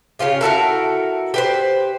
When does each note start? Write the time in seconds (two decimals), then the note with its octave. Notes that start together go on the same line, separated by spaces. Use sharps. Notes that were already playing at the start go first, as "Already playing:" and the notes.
0.19 C#3 C#4 F4 G4
0.41 E4 F#4 A4 A#4
1.34 G4 B4 C5